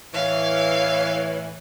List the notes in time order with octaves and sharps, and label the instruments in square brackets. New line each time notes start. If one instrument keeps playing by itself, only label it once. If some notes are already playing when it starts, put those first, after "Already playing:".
[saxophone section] A2 E3 [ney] C#5 [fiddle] F5